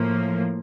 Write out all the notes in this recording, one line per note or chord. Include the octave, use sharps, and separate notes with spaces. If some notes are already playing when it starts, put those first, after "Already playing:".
Already playing: A2 F3 A#3